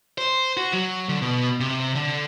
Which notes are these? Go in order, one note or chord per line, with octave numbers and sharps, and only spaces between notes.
C5
F#4
F#3
D3
B2
C3
D3